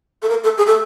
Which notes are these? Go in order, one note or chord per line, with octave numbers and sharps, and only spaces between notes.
A4
A#4
A4
G#4
A4